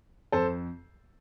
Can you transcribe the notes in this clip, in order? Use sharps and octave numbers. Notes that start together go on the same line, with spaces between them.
F2 A4 C5